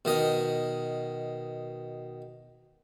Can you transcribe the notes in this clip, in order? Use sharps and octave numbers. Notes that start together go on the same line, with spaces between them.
B2 D#3 D#5